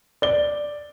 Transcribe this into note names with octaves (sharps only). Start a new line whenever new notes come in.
D5 G7